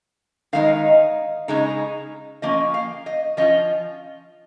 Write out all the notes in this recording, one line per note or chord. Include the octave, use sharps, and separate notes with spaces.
D#3 G#3 D#4 F5
C#3 G#3 D#4
F3 A#3 C#4 D#5
F5
D#5
F3 C#4 F4 D#5